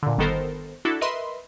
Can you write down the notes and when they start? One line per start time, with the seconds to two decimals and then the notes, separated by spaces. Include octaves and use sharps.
0.03 A#2 D3
0.18 G1 D#3 B3 A4 A#4 C5
0.85 D4 E4 F#4 A4
1.01 A#4 B4 D#5 E5 B5 C6